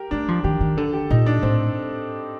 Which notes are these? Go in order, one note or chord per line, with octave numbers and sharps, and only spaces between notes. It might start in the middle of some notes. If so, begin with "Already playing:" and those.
Already playing: G4 A#4
A3 D4
F3
D#3 G4
D#3
D3 A4
G4
A#2 D#4
D4
A2 C4